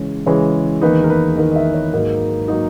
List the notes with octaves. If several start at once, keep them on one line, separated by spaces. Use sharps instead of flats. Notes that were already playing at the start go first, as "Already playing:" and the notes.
Already playing: C#3 E3 G#3 C#4 C#5
C#3 E3 G#3 C#4 C#5
E2 D#3 A#3 D#4 B4
A#4
B4
E2 D#3 A#3 D#4 D#5
D#5
E5
C#5
G#2 F#3 A#3 D#4 A#4
F#3 A#3 D#4